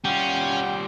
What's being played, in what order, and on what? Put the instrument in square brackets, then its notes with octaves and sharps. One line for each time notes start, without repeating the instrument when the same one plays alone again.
[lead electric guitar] G3 F4 [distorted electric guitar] C#4 [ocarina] F#5 [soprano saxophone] G5